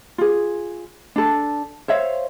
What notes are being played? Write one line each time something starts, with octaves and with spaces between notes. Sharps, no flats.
F4 G#4
D4 A4
C5 C#5 E5 F5